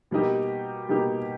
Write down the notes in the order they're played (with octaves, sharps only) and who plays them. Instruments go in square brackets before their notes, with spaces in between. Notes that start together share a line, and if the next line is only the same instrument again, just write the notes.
[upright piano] B2 G3 A#3 D#4 G4
B2 G3 A#3 D#4 G4